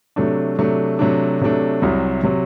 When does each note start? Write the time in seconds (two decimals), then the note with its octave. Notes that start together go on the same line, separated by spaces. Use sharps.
0.16 C3 F#3 A3 D4
0.59 C3 F#3 A3 D4
0.99 C3 F#3 A3 D4
1.41 C3 F#3 A3 D4
1.82 C2 C3 F#3
2.23 C3 F#3